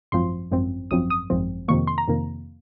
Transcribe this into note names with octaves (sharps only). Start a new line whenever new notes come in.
G#1 F#2 F3 C4 C6
G#1 F#2 F3 C4
G#1 F#2 F3 C4 D#6
D#6
G#1 F#2 F3 C4
F2 C3 D#3 A#3 C#6
C6
A#5
F2 C3 D#3 A#3